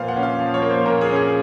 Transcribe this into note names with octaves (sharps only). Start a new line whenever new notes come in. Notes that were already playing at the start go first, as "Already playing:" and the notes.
Already playing: A#2 F3 A#3 B4 C5 F5
F#5
C#4
F5
F3
C#5
A#3
C5
A#2 A#4
G#4
C#4
G#4